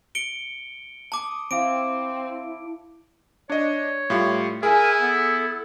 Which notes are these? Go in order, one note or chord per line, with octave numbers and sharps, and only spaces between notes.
C#7 D7 G7
A5 D6 D#6
C4 E4 F5 D6 D7
D4 C#5 D#5
A2 G3 F4
E4 G#4 A#4 G#5
B3 A4